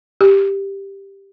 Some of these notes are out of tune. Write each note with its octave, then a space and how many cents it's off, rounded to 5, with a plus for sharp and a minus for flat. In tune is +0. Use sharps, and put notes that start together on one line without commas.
G4 +5